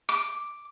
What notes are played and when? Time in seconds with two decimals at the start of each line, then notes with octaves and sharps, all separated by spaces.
0.09 D6